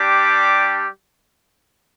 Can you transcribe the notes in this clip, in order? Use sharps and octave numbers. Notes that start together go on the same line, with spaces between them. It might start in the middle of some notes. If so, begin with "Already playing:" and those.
Already playing: G3 D4 G4 D6